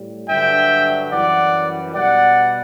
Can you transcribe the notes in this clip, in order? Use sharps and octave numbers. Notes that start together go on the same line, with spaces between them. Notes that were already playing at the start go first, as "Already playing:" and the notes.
Already playing: A2 G3
G2 D3 F#3 E5 G5
F#2 E3 G3 D5 F#5
B2 G3 D5 F#5